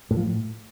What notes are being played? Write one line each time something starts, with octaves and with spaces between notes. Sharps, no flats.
A2
F3
A2